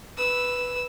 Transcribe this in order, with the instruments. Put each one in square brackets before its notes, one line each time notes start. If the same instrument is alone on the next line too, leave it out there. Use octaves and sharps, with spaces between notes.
[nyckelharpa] B4 [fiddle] E6